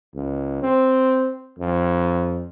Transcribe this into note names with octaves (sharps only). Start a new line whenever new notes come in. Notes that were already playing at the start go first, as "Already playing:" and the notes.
C#2
C4
F2